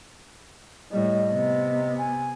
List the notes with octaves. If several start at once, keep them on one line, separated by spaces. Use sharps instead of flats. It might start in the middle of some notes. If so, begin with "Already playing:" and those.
A2 G3 D#5
C3 B3
G#5